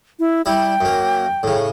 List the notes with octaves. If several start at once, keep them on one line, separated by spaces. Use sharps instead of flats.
E4
G3 E4 G5
F#2 A#3
A2 C#3